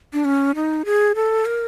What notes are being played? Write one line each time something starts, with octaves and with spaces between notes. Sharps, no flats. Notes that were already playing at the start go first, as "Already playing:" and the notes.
D4
C#4
D#4
G#4
A4
A#4